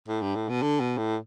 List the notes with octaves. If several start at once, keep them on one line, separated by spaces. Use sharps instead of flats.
A2
G2
A2
B2
D3
B2
A2